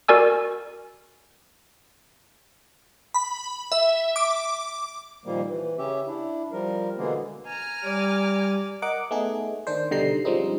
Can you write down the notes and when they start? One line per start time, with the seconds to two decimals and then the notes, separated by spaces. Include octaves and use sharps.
0.08 F#4 A#4 D5 G#5 E6
3.14 B5
3.72 E5
4.16 D6
5.25 A#2 D#3 F3 G3 A#3
5.48 E3
5.78 C#3 C#4 G4 E5
6.07 D4 E4
6.52 F3 G3 A#4
6.98 B2 D3 E3 G#3 A#3 B3
7.47 G#5 A#5 F6
7.83 G3 D5
8.82 A#4 D#5 F#5 D6
9.11 A3 B3 D#4 G#4
9.67 D#3 D4 C5
9.91 B2 D3 G3 D#4 A#5 C7
10.25 F3 G3 G#3 C4 C#4 D#4